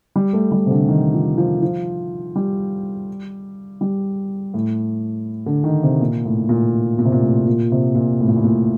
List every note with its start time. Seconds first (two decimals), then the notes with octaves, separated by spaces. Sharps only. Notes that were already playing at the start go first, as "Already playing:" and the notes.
0.16 G3
0.33 A3
0.52 G3
0.66 C3
0.71 D3
0.88 D#3
1.14 F3
1.38 F3
1.62 F3
2.36 G3
3.81 G3
4.54 A2
5.46 D3
5.64 D#3
5.83 C3
6.01 A#2
6.25 A2
6.49 A#2
6.99 A#2
7.05 C3
7.12 A#2
7.22 A2
7.47 A#2
7.72 C3
7.95 A#2
8.20 A2
8.28 A#2
8.36 A2
8.44 A#2